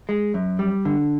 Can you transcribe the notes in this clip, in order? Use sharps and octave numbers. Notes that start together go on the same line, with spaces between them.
G#3
F#2
G3
D3